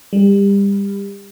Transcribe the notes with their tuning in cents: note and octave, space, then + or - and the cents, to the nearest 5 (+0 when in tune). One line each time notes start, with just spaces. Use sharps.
G3 +30